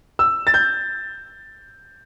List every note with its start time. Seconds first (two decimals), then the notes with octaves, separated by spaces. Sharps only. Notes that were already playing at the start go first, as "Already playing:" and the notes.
0.19 E6
0.47 A6
0.54 G6